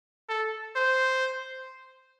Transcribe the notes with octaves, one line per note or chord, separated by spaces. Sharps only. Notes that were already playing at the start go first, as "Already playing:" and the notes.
A4
C5